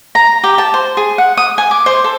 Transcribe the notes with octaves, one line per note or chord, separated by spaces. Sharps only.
A#5
G4
A5
C5
G#4
F#5
D#6
G#5
D6
C5
A4